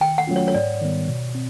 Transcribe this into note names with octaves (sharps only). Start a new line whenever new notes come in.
D#3 G5
F#5
F#3 A3 C#4 F4
C#5
C#5
G#2 D5
D#3 G3 B3
B2
C4